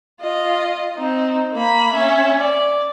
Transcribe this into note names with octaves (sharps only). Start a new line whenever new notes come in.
F4 D#5
C4 D#4
A#3 B5
C#4 E5
D5